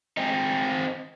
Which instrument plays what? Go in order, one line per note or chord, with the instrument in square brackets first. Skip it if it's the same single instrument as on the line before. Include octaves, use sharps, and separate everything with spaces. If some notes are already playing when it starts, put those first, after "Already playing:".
[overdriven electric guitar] C4 D#4